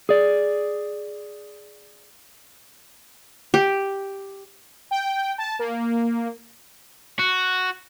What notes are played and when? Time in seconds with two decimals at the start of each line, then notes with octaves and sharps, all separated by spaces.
0.09 G#4 D5
3.54 G4
4.91 G5
5.38 A5
5.59 A#3
7.19 F#4